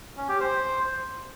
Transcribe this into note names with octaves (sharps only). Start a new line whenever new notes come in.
C#4
G4
C5